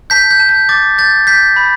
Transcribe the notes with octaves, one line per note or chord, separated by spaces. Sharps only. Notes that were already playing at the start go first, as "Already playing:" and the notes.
A5 G6 B6
G6
A5
G6
D6 A6
G6 A6
G6 B6
B5